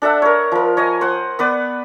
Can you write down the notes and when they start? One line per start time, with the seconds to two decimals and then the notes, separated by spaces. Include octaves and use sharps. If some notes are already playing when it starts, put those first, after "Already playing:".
0.02 D4 A4 E5 F#5
0.22 A#4 C#5
0.52 F3 A#4
0.77 C#5 D#5 G#5
1.01 C5 F#5
1.39 B3 B4 D5